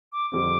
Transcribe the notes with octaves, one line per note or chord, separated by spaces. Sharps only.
D6
F2 D3 G3 C4 D6